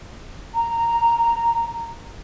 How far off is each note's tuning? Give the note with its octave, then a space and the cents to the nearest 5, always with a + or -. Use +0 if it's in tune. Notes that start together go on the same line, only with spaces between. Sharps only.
A#5 -10